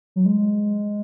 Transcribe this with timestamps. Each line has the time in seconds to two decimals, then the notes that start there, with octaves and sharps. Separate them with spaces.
0.16 F#3
0.26 G#3